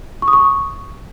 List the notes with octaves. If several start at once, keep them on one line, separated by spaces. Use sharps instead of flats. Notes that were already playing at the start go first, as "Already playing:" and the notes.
C#6
D#6
C#6